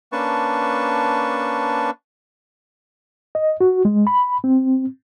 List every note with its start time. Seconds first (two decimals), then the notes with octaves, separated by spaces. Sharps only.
0.12 A#3 C#4 D4 B4 A5 C#6
3.35 D#5
3.61 F#4
3.85 G#3
4.07 B5
4.44 C4